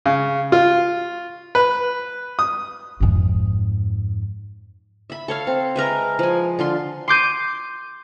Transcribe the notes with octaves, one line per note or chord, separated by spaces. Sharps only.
C#3
F4
B4
D#6
F2 G#2
E5 B5
A4 C#5 F5
C4
G#3 A#4 B4 E5
F3 G#5
D3 F4 C6
C6 D6 G6 D#7